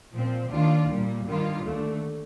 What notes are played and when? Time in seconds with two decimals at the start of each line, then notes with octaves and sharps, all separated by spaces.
0.12 A#2 F3 C4
0.50 D#2 D#3 A#3 D4 F4
0.87 A#2 G3 A#3
1.25 G2 D#3 G3 A#3 F4
1.63 D#2 D3 A3